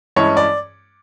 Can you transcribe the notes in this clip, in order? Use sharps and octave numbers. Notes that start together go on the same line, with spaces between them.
G2 E3 G#3 C#4 C#5
D5